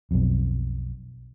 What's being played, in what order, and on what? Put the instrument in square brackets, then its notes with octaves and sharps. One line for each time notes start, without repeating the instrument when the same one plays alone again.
[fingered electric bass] B1 F2